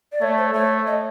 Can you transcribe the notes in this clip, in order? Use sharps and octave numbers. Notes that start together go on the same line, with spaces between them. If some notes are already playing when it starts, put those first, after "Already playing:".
D5
A3 C#5
C5
A3 C#5
D#5